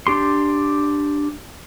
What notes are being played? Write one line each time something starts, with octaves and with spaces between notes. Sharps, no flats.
D4 G4 C6